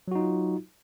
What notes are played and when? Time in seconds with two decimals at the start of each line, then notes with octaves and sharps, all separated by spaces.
0.08 F#3
0.11 F#4
0.15 D#4
0.19 F4